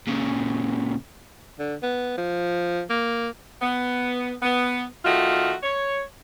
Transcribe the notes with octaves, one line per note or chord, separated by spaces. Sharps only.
A#2 C#3
D3
B3
F3
A#3
B3
B3
D#3 A3 F4 F#4
C#5